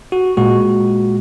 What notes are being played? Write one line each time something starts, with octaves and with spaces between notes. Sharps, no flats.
F#4
A#2 G#3 F#4